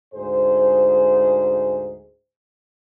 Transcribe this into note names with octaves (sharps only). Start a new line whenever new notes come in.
D2 G#2 G#4 C5